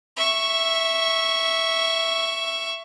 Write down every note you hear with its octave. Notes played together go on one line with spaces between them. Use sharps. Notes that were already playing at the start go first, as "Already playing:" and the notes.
E5 C#6